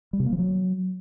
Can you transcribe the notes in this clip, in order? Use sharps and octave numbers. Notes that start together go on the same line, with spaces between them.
G3
C3
A#3
F3
F#3